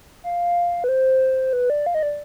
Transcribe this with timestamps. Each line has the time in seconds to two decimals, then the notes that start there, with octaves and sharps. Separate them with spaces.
0.24 F5
0.84 B4
0.89 C5
1.53 B4
1.70 D5
1.86 F5
1.94 D#5
2.03 D5